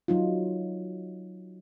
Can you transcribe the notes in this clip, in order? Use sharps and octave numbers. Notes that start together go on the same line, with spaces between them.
F#3 D#4 F4